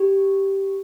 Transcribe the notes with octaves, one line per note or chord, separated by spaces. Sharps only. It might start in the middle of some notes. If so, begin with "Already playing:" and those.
Already playing: G4